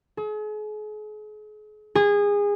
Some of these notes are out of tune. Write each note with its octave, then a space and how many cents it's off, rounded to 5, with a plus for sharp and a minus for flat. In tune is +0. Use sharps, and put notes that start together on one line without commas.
G#4 +40
G#4 -25